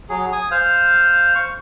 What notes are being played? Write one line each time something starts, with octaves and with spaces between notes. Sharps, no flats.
F#3 G#4
G#5 D#6
C5 F5
C#6